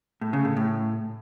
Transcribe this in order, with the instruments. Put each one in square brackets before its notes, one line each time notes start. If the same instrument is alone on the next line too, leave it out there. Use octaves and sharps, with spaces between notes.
[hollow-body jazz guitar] A2
C#3
A2
A2